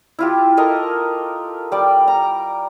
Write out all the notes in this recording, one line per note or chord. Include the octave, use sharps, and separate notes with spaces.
E4 F4 G4
A4 A#4 D#5 A5
G3 D5
A#5